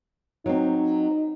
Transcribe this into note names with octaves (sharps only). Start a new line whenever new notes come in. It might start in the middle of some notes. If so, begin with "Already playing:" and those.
F#3 C4 D#4